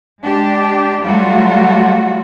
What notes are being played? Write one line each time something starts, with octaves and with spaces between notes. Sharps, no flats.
G#3 D4 G4
F#3 G3 A3 F4 F#4